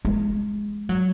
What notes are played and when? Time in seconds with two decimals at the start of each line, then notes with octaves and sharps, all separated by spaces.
0.05 G#3
0.89 F#3